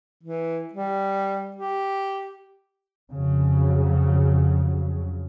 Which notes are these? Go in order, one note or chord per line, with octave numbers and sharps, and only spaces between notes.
E3
G3
G4
F2 C#3 F#3